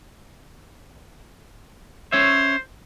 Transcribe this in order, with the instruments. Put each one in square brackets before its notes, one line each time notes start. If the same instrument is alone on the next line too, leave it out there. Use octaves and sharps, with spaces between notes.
[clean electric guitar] C#4 C#5 E5 [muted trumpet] C5